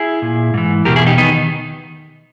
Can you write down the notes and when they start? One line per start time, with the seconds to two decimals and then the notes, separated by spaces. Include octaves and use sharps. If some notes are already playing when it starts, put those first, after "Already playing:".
Already playing: E4 G#4
0.22 A#2
0.54 G#2 E3
0.85 E2 B2 G4 A#4
0.96 E4 G#4
1.07 D#4 G4
1.18 D#3 B3 D#4